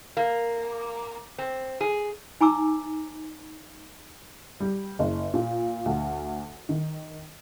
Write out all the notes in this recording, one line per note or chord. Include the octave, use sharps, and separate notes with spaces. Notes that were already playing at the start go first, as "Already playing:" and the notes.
A#3
C4
G#4
D#4 G#5 A#5 D6 E6
G3
F#1
A#2
D2
D#3